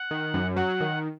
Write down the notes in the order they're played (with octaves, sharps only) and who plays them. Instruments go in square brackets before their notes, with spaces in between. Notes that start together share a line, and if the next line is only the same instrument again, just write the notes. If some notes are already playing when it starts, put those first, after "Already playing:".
Already playing: [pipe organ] F#5
[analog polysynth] D#3
F#2
[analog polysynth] F#3 [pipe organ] F#5
[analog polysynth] D#3